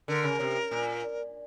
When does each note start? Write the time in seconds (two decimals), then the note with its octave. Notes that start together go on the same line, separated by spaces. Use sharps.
0.08 D3 A#4
0.24 C#3
0.40 C3
0.71 A#2